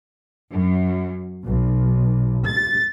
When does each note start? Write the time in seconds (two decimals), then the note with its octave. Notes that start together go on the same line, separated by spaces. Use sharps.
0.52 F#2
1.44 B1
2.46 A6